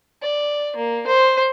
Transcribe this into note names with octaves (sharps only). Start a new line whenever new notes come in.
D5
A#3
C5